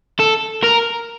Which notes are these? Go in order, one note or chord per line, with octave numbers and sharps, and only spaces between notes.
A4
A#4